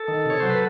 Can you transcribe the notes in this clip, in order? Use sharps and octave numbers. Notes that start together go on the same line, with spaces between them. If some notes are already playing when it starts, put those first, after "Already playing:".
Already playing: A4
D#3
C3 C#5
F#3 C5
B4